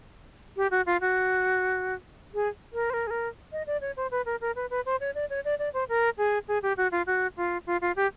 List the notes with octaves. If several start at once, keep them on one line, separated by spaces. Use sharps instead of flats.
G4
F#4
F4
F#4
G#4
A#4
C5
A#4
G#4
A#4
D#5
D5
C#5
C5
B4
A#4
A#4
B4
B4
C5
C#5
D5
C#5
D5
D5
C5
A#4
G#4
G#4
G4
F#4
F4
F#4
F4
F4
F4
G4